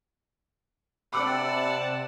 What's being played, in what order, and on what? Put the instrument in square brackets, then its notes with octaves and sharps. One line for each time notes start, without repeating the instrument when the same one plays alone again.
[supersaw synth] C3 A5 [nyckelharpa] D5 F#5 [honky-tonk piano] B5 D6 E6